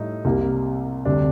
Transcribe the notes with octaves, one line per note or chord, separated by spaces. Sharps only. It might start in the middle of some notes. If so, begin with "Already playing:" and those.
Already playing: A2 G3 D#4
C2 C3 G3 A#3
D2 C3 G3 D4